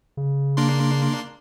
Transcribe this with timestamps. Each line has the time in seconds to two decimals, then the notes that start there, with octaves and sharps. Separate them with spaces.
0.17 C#3
0.57 A#3 D4 C6